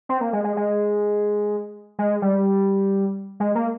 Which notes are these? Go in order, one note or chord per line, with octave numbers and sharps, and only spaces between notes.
C4
A#3
G#3
G#3
G#3
G#3
G3
G#3
A#3